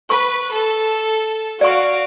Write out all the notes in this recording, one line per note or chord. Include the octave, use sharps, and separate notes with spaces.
B4 C#6
A4
F#4 D5 F5 C#6 D7